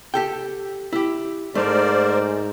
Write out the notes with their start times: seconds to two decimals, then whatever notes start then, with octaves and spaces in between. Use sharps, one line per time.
0.14 G4 A4 G5
0.93 E4 G4
1.55 G#2 A3 A#4 C5 D5